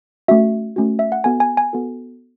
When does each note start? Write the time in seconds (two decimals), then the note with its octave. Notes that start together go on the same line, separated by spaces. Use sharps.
0.28 A3 C#4 F#4 E5
0.76 A3 C#4 F#4
0.99 E5
1.12 F#5
1.24 B3 F#4 A4 G#5
1.40 G#5
1.57 G#5
1.73 B3 F#4 A4